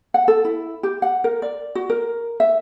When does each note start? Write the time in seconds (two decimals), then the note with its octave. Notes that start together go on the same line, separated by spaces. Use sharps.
0.14 F#5
0.28 A4
0.45 E4
0.83 G4
1.02 F#5
1.24 A#4
1.42 D5
1.75 F#4
1.90 A#4
2.40 E5